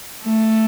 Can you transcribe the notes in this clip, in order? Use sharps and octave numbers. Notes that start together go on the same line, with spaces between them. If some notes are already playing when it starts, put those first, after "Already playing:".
A3